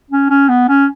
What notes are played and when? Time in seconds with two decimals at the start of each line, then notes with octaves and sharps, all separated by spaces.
0.11 C#4
0.30 C#4
0.49 B3
0.69 C#4